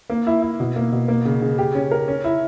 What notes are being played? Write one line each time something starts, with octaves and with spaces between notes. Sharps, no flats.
A#3
E4
E4
B2
A#3
B2
A#3
C#3
C#3
G4
C#4
A#4
C#4
E4